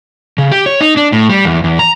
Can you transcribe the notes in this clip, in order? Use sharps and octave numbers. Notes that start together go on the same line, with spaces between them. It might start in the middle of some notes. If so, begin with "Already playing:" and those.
C#3
G4
C#5
D#4
D4
A2
G3
E2
E2
A#5